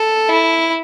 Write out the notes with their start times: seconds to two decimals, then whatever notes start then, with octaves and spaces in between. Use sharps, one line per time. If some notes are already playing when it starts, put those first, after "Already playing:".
Already playing: A4
0.29 E4